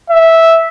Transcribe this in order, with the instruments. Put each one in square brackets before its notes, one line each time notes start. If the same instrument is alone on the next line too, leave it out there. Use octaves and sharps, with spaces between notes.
[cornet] E5